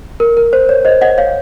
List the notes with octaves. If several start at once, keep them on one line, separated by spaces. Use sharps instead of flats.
A#4
A#4
C5
C#5
C5 D#5
D#5 F#5
C#5 F5